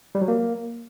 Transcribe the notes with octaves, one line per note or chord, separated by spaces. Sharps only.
G3
F#3
A#3